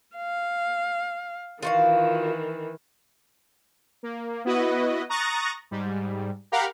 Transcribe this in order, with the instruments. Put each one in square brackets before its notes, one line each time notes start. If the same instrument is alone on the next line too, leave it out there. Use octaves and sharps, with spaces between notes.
[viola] F5
[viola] D#3 E3 [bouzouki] F4 F#4 F5
[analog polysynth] A#3
B3 E4 F#4 B4 D#5
A#5 C#6 D#6 F#6 A6 A#6
G#2 G3
G4 A#4 F5 F#5 A#5 B5